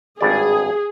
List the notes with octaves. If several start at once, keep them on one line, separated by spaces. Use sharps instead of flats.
G#1 G2 G#4 D5